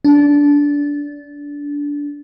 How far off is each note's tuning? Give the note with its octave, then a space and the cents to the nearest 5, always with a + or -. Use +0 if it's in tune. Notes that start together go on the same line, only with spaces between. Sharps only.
D4 -20